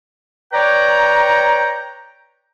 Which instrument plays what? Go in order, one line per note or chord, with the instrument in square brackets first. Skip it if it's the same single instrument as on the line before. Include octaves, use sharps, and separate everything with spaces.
[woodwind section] B4 C#5 D5 G5 A#5